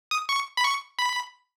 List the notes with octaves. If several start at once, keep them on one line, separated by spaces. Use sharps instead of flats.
D#6
C#6
B5
C#6
B5